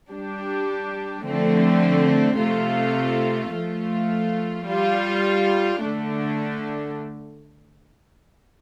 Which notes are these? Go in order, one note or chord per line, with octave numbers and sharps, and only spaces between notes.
G3 D4 G4
D3 F3 A3 C4
C3 A3 F4
F3 A3 F4
G3 F4
D3 A3 D4